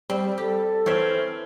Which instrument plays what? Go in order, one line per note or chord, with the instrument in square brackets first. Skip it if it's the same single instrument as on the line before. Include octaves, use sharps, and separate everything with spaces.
[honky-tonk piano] G3 [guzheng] C4
[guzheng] G4 [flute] A4
[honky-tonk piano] E3 F6 G#6 [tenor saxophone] C4 [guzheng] C#5 E5